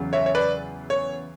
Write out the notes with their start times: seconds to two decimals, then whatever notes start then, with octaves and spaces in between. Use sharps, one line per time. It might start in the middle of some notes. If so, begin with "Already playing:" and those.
Already playing: E2 C#3 F#3
0.13 C#5 E5
0.26 C#5
0.35 B4 D5
0.90 C#5